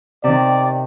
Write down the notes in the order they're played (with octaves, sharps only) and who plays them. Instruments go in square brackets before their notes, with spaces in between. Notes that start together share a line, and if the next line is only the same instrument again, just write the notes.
[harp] C3 D#3 [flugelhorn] D5